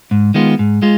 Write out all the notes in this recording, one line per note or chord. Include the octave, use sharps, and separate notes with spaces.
G#2
D#3 G#3 B3 F4
G#2
G#3 F4